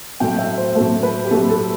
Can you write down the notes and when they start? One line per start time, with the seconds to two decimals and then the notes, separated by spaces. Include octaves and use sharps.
0.20 A2 F#3 A3 G5
0.38 E5
0.58 C5
0.75 A2 F#3 A3 A4
1.03 B4
1.25 G4
1.31 A2 F#3 A3 A4
1.50 A4